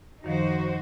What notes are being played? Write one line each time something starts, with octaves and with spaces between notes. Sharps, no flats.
F#2 D#3 F3 D#4 F#4 C5